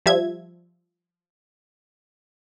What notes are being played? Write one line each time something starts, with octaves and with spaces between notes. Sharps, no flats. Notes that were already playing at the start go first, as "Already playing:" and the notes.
F3 G3 E5 G#6